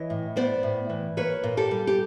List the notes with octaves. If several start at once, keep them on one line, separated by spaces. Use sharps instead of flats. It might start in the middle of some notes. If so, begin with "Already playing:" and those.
Already playing: E3 C#5 D#5
A2
B3 C5 D5
A2
E3
A#3 B4 C#5
A#2
G4 A4
G3
G4